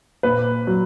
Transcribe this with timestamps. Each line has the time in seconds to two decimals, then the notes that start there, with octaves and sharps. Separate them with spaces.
0.23 A#2 B4
0.67 F#3